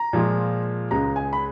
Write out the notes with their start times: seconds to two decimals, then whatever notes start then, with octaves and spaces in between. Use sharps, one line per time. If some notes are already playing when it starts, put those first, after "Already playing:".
Already playing: A#5
0.13 A#2 F3 G#3
0.91 C#2 C#3 G#3 A#5
1.16 G#5
1.33 B5